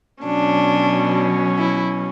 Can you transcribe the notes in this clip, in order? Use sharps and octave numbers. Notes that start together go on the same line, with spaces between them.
B2 F#3 C#4 D4
E4